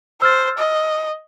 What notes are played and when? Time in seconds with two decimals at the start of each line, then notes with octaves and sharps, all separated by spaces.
0.22 C5 E6 F6 A6
0.58 D#5